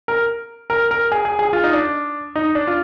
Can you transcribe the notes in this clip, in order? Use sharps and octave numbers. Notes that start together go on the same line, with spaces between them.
A#4
A#4
A#4
G#4
G#4
G#4
F4
D#4
D4
D#4
D4
F4